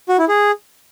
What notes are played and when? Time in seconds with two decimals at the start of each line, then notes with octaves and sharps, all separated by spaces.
0.09 F#4
0.19 E4
0.29 G#4